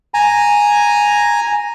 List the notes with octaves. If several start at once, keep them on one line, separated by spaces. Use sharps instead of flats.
G#5 A#5